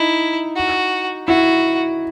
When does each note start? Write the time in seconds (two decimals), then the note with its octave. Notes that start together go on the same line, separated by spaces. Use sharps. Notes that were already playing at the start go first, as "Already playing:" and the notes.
Already playing: D#4 E4
0.55 F#4
1.27 E4 F#4